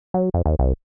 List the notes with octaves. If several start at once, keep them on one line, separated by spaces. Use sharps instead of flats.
F#3
F2
D#2
C2